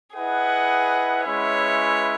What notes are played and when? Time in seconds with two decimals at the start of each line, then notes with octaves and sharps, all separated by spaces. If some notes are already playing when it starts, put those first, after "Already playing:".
0.15 E4 G#4 B4 D#5 F#5
1.24 G#3 C#4 E4 B4 C#5 E5